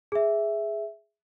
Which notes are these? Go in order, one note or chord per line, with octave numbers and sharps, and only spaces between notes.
G#4 E5